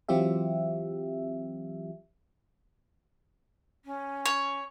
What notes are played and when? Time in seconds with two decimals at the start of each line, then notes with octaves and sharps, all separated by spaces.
0.09 E3 F#3 C4 F4 G4 E5
3.85 C#4
4.25 C#5